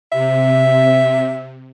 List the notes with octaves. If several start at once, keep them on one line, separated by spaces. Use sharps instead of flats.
C3 E5